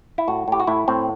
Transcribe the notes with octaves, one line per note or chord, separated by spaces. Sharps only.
E4
A2 F#4
A2 G4
F#4
A2 E4
A2 C4